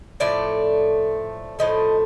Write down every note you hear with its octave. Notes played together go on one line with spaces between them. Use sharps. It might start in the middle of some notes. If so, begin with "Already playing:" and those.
A2 F3 A3 D5
A2 F3 A3 D#5